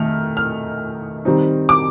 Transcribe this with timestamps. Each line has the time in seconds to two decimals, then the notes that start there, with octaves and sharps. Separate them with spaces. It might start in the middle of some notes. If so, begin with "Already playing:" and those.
Already playing: D#3 A3 F6
0.37 F6
1.25 D#3 G3 C4 D#4
1.69 D6